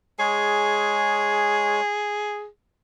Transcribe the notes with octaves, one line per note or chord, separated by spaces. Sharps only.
G#3 G#4 C#5